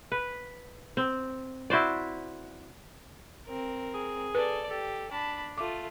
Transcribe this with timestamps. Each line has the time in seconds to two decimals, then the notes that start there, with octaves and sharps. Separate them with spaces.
0.12 B4
0.97 C4
1.70 E4 F#4 C5 D5
3.46 C4 A#4
3.94 G#4
4.35 A4 B4 D5
4.70 G4 A4
5.11 D4 A5 B5
5.58 A3 F4 D6